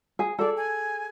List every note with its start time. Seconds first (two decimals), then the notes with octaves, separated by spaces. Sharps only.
0.19 G#4
0.39 G#4 A4 D5
0.57 G#5